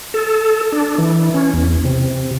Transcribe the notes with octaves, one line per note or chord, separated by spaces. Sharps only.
A4
D4
E3
C#4
E2
C3